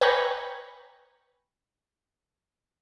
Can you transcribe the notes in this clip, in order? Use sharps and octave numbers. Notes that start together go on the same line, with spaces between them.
B4 G5 G#5 A#5 B5 C#6